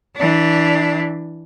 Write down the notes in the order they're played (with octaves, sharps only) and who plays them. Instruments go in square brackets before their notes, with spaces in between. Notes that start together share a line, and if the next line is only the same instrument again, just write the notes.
[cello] E3 D4